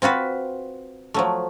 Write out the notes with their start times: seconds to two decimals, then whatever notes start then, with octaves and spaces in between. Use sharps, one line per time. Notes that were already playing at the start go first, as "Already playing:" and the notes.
0.02 C4 F4 F#4 B4
1.14 F3 F#3 A3